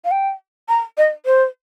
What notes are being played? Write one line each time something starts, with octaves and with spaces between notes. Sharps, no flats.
F5
G5
A#5
D#5
C5